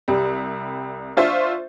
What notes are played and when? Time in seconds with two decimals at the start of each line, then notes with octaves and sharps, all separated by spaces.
0.08 C2 G3
1.17 D4 F4 C5 E5 C#6